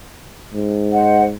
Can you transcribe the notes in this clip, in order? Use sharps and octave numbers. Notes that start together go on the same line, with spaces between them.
G#2
C5 D#5 F#5